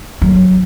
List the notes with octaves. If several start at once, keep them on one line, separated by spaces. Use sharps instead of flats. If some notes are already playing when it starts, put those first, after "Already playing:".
F#3